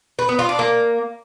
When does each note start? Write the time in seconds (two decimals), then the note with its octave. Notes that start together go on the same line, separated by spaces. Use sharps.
0.19 B4
0.29 B3
0.39 F4
0.49 D4
0.59 A#3